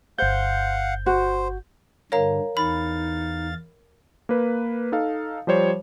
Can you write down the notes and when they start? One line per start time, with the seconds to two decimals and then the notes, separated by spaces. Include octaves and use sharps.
0.18 G1 C5 F5 F#5 G6
1.06 F#4 C5
2.12 G2 D3 A#4 C#5 F5 A#5
2.57 E2 D#4 F5 B5 A6
4.29 A#3 B4
4.92 D#4 A4 F5
5.47 F3 G3 C5 C#5